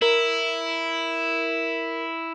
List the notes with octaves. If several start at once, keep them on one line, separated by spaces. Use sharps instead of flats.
E4 A#4